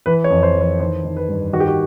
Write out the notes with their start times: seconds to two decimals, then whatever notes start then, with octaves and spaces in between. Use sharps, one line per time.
0.06 E3 B4
0.24 C#5
0.30 F2
0.43 C5
0.55 E3
0.61 C5
0.80 D#3 C5
1.05 D#3
1.17 B4
1.29 G2
1.53 D#3 F#4
1.60 G4
1.67 F#4